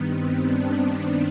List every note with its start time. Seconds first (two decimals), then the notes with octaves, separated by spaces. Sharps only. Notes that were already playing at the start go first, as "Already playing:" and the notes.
Already playing: G2 D#3 B3
0.08 C4
0.46 D4